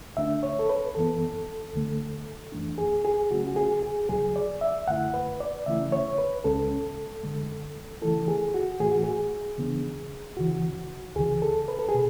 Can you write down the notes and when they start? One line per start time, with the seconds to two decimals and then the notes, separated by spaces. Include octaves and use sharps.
0.17 D2 D3 A3 D4 E5
0.43 C#5
0.59 A4
0.69 B4
0.95 F#2 E3 B3 A4
1.74 D2 D3 A3
2.52 F#2 E3 A3 D4
2.78 G#4
3.05 G#4
3.31 C#3 F#3 A3 C#4 F#4
3.47 F#4
3.56 G#4
3.83 G#4
4.09 D2 C#3 F#3 G#4
4.36 D5
4.61 E5
4.88 F#2 D3 A3 E4 F#5
5.14 B4
5.40 D5
5.66 C#3 E3 A3 C#4 E4 E5
5.92 C#5
6.18 B4
6.44 C#2 C#3 G#3 C#4 A4
7.23 F#2 D3 G#3
8.02 C#3 E3 A3 E4 A4
8.28 G#4
8.54 F#4
8.80 A2 E3 A3 G#4
8.92 F#4
9.03 G#4
9.58 C#3 E3 B3 D4
10.37 D2 C#3 E3 F#4
11.16 D2 C#3 E3 G#4
11.42 A4
11.68 B4
11.79 A4
11.89 G#4
11.94 B2